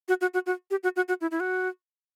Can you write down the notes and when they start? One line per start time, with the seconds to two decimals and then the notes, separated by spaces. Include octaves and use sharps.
0.08 F#4
0.21 F#4
0.34 F#4
0.46 F#4
0.71 G4
0.83 F#4
0.96 F#4
1.08 F#4
1.21 E4
1.31 E4
1.40 F#4